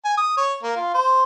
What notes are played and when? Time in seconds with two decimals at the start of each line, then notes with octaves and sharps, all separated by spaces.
0.05 G#5
0.17 D#6
0.37 C#5
0.63 A#3
0.76 F4
0.94 C5